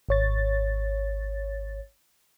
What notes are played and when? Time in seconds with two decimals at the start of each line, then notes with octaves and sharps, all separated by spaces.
0.09 G#1 C#5 A6